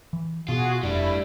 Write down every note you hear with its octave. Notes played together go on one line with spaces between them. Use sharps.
E3
B2 F4 F#4 G#4
F1 G3 A3 D4 E4